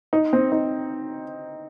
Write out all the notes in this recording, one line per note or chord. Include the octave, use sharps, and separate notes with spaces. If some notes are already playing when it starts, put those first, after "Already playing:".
D#4
C4
D#4